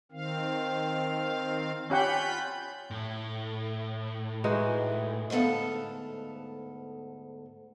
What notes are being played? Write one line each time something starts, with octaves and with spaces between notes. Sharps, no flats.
D#3 C4 F5
C#4 F4 G4 F#5 B5 G6
A2
E3 G#3 D#4 F#4
D2 G#2 B3 A4 F5